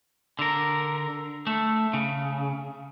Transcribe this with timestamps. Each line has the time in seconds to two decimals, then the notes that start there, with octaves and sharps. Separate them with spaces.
0.39 D3 A#4
1.47 A3
1.93 C#3